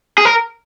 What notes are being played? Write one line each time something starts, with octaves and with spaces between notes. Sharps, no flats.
G#4
A#4